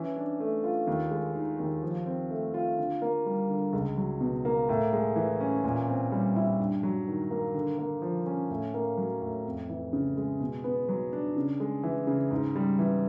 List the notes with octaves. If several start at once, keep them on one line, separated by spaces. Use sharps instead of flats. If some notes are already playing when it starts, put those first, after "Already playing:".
Already playing: E3 C#4
D4
A3
F4
D#2
G#3
D#3
D#2
F3
C4
A3
F4
D3
A#3
G3
D3
C#2
F#3
B2
A#3
A2
G#3
E3
C#4
A#2
C4
G3
E4
G2
F#3
D#3
A#3
D3
A#3
F3
C#4
A2
A#3
F#3
A2
F2
E3
C#3
G#3
B2
B3
F#3
D4
C#3
G#3
E3
C#3
G#2
G3
E3